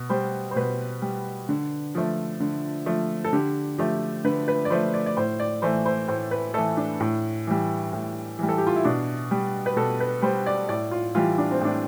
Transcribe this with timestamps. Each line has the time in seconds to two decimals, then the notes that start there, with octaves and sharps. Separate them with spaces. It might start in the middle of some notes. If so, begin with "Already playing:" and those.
Already playing: B2
0.10 G3 C5
0.51 C5
0.56 B2 B4
1.02 G3
1.49 D3
1.95 F3 A3
2.40 D3
2.86 F3 A3
3.25 A4
3.33 D3 G4
3.78 F3 A3 G4
4.24 D3 B4
4.48 B4
4.65 D5
4.70 F3 A3 C5
4.94 D5
5.06 D5
5.17 A2 C5
5.40 D5
5.62 E3 A3 C5
5.86 C5
6.08 A2 C5
6.31 B4
6.54 E3 A3 A4
6.77 D4
7.00 A2
7.47 E3 G3
7.93 A2
8.39 E3 G3
8.49 A4
8.58 G4
8.67 F4
8.76 E4
8.85 B2 D4
9.31 G3
9.66 B4
9.76 B2 A4
10.00 B4
10.22 G3 C5
10.46 D5
10.69 A2 D5
10.91 F4
11.15 E3 G3 F4
11.38 D4
11.51 C4
11.61 A2 D4